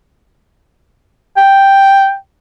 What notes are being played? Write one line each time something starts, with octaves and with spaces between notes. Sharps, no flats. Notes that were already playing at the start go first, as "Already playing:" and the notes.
G5